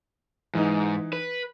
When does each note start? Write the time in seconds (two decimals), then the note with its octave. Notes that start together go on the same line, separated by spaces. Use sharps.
0.55 G#2 E3 D#4
1.13 B4